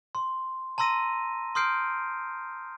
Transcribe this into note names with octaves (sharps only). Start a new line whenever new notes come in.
C6
A5 A#5 C6 E6 A#6 D#7
C6 D#6 F6 G6 C7 D7